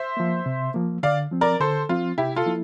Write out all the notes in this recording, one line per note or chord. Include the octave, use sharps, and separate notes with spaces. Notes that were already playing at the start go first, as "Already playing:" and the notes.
Already playing: C5 E5
F3 A#3
C3
F3 A#3
D3 D5 F5
F3 C4
A#4 D5
D3 A4 C5
F3 C4 F4
C3 E4 G4
F4 A4
F3 A#3 E4